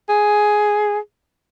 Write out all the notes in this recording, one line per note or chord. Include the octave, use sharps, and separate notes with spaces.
G#4